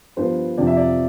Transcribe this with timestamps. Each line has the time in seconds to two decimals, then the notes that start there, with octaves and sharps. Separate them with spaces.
0.17 G2 F3 B3 C5
0.58 F2 C3 F3 D5
0.67 E5
0.77 D5